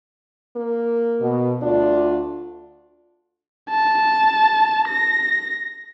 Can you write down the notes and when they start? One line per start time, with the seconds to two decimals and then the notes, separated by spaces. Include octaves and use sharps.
0.56 A#3
1.21 B2
1.62 D2 D4 F4 D5
3.70 A5
4.88 A#6